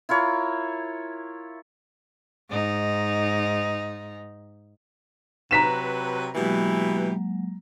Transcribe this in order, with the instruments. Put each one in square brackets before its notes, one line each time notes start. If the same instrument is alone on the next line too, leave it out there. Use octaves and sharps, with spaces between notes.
[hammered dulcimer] E4 F4 A#4 C#5
[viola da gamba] G#2 D#4
[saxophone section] C3 F#3 B4 [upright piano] A#5 B6 E7
[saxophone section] B2 E3 G4 [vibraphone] F#3 G#3 A#3